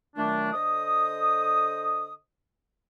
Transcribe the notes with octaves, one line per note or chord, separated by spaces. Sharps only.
A#2 D#3 F#3 A3 D4
D3 A4 C5 D#5 D#6